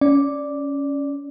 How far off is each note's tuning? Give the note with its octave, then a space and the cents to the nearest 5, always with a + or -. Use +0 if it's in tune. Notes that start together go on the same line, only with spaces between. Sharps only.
C#4 +10 D5 +0